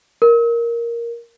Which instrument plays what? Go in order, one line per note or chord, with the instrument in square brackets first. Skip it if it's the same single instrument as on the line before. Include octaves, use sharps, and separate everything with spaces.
[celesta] A#4